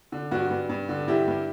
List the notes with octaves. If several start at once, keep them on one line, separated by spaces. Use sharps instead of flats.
D3
G2 F#4
G2
G2
D3
G2 E4 G4
G2